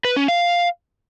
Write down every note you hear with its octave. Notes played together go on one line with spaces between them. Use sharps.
B4
C#4
F5